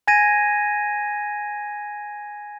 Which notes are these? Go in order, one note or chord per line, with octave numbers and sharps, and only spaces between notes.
G#5 G#6 A#6 D#7